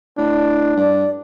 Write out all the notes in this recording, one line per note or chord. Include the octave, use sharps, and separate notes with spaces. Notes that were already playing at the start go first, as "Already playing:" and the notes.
A2 D4
G2 D5